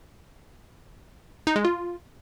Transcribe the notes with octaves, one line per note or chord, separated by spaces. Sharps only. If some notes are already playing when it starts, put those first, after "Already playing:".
D#4
G#3
F4